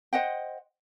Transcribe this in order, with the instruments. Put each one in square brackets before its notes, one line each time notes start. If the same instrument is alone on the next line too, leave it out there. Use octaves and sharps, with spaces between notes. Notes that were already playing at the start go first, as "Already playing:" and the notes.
[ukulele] C5 D#5 F#5 G5